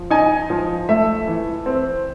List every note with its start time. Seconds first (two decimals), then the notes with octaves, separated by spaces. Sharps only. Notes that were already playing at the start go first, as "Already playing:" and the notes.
Already playing: F3
0.10 D#4 G#5
0.50 F3
0.89 A3 E5
1.27 E3
1.66 C4